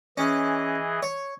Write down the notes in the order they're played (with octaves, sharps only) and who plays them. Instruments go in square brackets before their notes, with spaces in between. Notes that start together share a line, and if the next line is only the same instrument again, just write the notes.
[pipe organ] E3 G#4 D#5 [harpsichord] C#4
[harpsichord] C#5